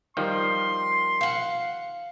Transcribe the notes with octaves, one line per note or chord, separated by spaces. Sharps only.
D#3 F3 G3 C6
F5 F#5